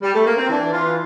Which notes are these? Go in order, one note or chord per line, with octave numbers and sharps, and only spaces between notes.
G3
A3
A#3
C4
E3 D4
E3 F4